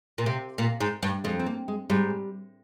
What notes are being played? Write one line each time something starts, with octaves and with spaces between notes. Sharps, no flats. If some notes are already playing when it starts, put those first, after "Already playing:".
A#2
C3
A#2
G#2
G2
F2 G#3
C4
A#3
G#3
G#2 G3